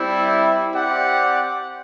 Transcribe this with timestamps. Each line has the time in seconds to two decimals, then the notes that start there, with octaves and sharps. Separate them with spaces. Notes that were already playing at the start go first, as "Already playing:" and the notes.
Already playing: G3 C4 E4
0.74 C4 G4 D5 F#5